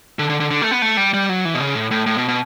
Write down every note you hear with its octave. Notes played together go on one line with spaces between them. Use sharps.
D3
D3
D3
D3
A3
B3
A3
G3
G3
F#3
E3
B2
C#3
A2
A2
A2
B2
B2